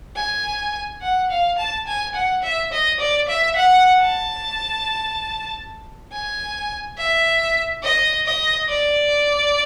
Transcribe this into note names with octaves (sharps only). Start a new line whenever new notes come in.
G#5
F#5
F5
A5
G#5
F#5
E5
D#5
D5
E5
F#5
A5
G#5
E5
D#5
D#5
D5